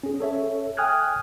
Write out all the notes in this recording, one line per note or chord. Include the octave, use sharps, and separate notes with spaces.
C#4 G#4
A4 C#5 E5
G5 G#5 D#6 F6 F#6 G#6